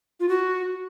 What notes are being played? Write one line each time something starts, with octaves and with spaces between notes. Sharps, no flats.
F4
F#4